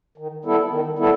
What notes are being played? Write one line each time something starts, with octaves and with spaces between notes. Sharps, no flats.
D#3
G3 B3 E4 A4
D#3
G3 B3 E4 A4